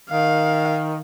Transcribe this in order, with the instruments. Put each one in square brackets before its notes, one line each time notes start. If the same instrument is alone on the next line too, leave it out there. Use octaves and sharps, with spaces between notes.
[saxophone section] D#3 [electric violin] F5